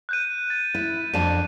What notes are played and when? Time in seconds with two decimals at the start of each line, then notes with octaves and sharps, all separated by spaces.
0.09 F#6 G6 D#7
0.50 A6
0.75 E4
1.14 F2 D4 A5 D#7